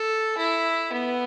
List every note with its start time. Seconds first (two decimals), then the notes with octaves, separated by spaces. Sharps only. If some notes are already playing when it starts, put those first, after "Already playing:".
Already playing: A4
0.38 E4
0.92 B3